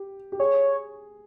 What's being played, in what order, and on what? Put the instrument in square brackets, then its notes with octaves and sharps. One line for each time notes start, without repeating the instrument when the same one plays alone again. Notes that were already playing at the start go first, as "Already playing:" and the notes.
Already playing: [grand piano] G4
G4
[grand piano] G#4 [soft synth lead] C#5